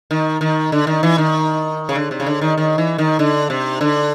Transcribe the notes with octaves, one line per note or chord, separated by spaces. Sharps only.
D#3
D#3
D3
D#3
E3
D#3
C#3
D3
C3
C#3
D3
D#3
D#3
E3
D#3
D3
C3
D3